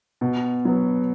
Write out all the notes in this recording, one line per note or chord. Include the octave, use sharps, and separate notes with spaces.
B2
F#3 B3